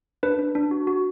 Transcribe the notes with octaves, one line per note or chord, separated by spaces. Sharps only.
D4 B4
D4
D4
F#4
F#4